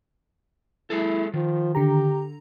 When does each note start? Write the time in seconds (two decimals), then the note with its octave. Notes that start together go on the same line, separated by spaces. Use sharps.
0.90 G#3 E4 G#4 A4
1.34 D#3 F3
1.75 D3 G4 A#5